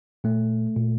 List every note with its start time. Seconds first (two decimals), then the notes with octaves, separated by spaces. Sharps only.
0.24 A#2 A3
0.76 A#2